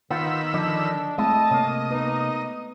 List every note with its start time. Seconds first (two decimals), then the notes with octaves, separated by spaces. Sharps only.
0.11 D#3 B3 F4 C5 B5 E6
0.54 D3 F3 D4 D5 D#5
1.18 G#3 A3 C4 E4 D#5 A5
1.51 C3 A#3 C#5
1.91 B3 D#4 B4